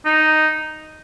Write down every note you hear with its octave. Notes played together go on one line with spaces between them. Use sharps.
D#4